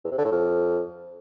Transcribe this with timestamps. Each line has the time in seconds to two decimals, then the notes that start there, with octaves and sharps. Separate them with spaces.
0.05 E2
0.11 C3
0.18 D3
0.25 A2
0.31 F2